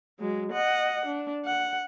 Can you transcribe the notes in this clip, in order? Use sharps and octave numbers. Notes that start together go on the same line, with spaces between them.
F#3 G#3
D#5 F#5
D4
F#5